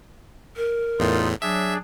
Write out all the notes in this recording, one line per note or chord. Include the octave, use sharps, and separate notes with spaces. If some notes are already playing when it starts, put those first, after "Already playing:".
A#4
E2 A2 D#4 F4
F#3 D4 G#4 E5